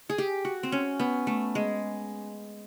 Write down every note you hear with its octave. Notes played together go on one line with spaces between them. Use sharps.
G#4
G4
F#4
C4
C#4
B3
A3
G#3